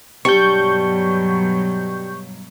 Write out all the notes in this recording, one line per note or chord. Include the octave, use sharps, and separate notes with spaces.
G2 B2 F#3 G3 D4 C#6 G6